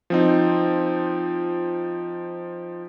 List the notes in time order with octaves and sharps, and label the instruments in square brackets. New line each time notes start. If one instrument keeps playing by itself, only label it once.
[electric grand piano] F3 C4 D#4